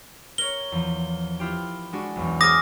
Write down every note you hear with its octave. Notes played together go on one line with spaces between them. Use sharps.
A#4 C#5 G7
E2 F3
E4 F4 G4
G#3 D4 F#4
B1 E2
G#4 C5 D6 D#6 F6 A#6